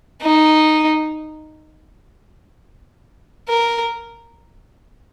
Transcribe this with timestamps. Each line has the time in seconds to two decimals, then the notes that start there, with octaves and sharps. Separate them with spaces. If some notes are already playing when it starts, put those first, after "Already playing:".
0.22 D#4
3.48 A#4